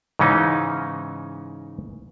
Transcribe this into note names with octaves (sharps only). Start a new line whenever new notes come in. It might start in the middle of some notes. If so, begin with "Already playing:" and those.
G#2 C#3 E3 C#4 D#4